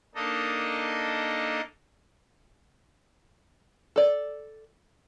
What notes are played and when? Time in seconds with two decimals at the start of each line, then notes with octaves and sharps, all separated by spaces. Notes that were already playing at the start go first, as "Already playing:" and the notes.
0.15 A#3 D4 D#4 A4 D#5
3.96 A4 D5